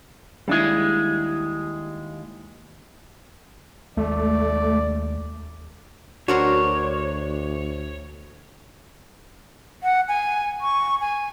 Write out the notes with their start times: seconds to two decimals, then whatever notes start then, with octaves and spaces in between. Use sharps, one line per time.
0.48 D#2 G3 G#3 D4 E4
3.97 D#2 G#3 A3 D5
6.28 D2 D4 F#4 A#4 C5 C#5
9.83 F#5
10.08 G#5
10.61 C#6
11.00 G#5